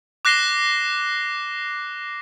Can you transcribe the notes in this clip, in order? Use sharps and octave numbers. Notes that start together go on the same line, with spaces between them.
D6 F#6 A#6 C7 E7 G7